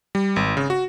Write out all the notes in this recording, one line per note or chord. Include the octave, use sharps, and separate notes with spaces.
G3
G#1
C#3
F#4